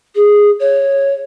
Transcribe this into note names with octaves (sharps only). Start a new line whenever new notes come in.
G#4
C#5